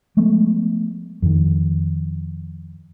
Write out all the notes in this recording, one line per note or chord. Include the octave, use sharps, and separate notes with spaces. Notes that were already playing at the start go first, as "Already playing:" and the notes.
F3 G#3 A3 B3
F2 D#3